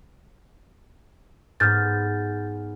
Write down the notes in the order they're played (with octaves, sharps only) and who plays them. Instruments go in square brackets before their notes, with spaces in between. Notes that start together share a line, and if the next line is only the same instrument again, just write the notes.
[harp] G#2 B3 [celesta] F6 G6 A6